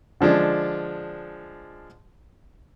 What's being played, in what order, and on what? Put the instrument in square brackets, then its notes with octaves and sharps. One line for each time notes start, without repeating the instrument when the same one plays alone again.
[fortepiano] D3 F3 G#3 D4